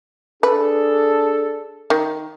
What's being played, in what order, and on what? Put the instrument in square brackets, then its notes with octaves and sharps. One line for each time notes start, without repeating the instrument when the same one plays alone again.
[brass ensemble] D4 G#4 A4 [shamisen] B4
[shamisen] D#3